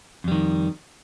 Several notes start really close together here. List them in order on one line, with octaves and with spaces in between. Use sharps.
F2 G3 D#3